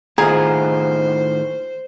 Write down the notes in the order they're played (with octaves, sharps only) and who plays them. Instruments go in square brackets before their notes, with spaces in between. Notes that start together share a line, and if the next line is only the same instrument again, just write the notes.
[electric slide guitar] A2 D#3 F4 [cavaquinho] G#4 F#5 [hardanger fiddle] C5 [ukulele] A#5